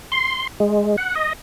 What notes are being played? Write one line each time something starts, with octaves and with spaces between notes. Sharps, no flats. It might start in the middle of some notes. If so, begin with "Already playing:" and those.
C6
G#3
F#5
D#5